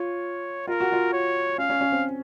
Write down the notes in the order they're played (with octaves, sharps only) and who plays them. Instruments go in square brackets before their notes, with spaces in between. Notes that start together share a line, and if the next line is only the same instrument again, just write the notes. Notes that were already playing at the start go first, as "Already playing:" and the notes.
Already playing: [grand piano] F4 [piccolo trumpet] C#5
[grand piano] F4 [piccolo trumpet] A#4
[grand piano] F#4
F4
[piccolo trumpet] C#5
[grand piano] C#4 [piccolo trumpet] F5
[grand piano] C#4
C#4
C4